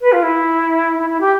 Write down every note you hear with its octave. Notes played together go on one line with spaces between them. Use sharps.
B4
F4
E4
E4
E4
G4